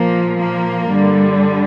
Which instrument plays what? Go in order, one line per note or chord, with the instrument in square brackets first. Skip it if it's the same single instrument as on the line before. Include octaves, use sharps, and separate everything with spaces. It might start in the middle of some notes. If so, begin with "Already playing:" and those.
Already playing: [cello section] A#2 F3 A#3
A#3
G2 D3 G3